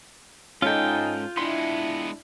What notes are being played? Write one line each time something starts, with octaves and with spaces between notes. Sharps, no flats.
G#2 G#3 C#4 D#4 F4 A4 G5
G#3 B3 D4 E4 C6